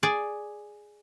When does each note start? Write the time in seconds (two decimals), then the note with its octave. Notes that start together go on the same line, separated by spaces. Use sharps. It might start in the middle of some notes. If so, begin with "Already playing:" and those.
0.03 G#4 D5